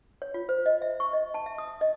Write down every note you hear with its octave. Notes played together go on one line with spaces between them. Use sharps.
C#5
F4
C5
D#5
E5
C#6
D#5
A5
E5
D#6
D#5